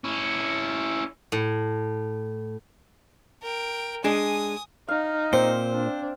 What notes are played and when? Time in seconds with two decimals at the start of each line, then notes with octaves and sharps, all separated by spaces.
0.04 C#4 E4
1.32 A2
3.42 A#4 G5
4.04 G#3 D4 G#5 D#6
4.88 D#4 F5
5.33 A#2 C4 C5
5.72 D4